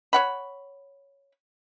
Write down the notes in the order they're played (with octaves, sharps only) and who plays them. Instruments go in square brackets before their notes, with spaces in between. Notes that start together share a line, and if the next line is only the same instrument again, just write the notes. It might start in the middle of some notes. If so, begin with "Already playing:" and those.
[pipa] C#5 F#5 B5